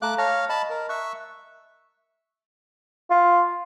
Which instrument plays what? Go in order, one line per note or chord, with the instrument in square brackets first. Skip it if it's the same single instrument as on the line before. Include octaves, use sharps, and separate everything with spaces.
[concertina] A3 D6 F#6 [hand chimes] F5 A#5
[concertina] C#5 F5 [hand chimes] A5 A#6
[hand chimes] D#5 [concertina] A5 B5
[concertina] A#4
[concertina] E5 C#6 [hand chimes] F#6
[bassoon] F4